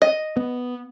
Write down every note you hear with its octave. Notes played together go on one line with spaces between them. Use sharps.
D#5
B3